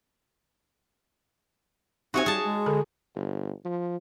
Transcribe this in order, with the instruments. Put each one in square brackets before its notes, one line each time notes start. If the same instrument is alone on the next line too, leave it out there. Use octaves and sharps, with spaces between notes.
[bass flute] C4 [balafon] D#4 G4 E5 [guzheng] F#4 C#5 G#5
[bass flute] G3 [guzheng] G#4 A5
[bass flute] G#3
[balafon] D3 A4
[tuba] G1
F3